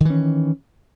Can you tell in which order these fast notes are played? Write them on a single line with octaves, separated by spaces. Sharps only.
D#3 E3 C#4